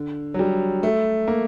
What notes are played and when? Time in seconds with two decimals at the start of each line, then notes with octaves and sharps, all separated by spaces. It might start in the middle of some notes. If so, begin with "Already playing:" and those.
Already playing: D3
0.34 F#3
0.39 G3
0.83 A3
1.28 A#3